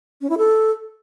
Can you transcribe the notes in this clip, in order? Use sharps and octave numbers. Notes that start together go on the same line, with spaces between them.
C#4
E4
A4